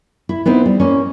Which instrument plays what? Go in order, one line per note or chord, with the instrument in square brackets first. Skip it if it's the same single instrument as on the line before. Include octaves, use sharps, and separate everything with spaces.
[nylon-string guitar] E4
B3 C4 D#4 E4
G3
A#3 C#4